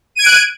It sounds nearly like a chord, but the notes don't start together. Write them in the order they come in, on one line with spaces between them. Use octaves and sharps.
D#7 G#6 D7 F#6